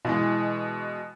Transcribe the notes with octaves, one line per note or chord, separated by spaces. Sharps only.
B2 E3 G#3